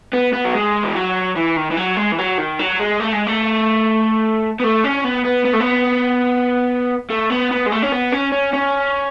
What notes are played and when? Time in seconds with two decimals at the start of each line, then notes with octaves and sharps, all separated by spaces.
0.13 B3
0.33 B3
0.45 F#3
0.54 G#3
0.84 E3
0.96 F#3
1.36 E3
1.57 D#3
1.71 E3
1.77 F#3
1.97 G#3
2.12 E3
2.18 F#3
2.38 D#3
2.59 F#3
2.80 G#3
3.00 A3
3.13 G#3
3.27 A3
4.60 B3
4.64 A3
4.84 C#4
5.04 B3
5.25 B3
5.45 B3
5.54 A3
5.60 B3
7.10 A3
7.30 B3
7.51 B3
7.66 G#3
7.72 A3
7.82 C#4
7.92 B3
8.12 C#4
8.32 C#4
8.53 C#4